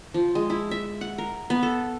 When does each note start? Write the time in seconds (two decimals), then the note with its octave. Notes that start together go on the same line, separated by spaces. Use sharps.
0.14 F3
0.35 G#3
0.50 E4
0.71 E5
1.01 F#5
1.18 A#4
1.50 B3
1.63 A4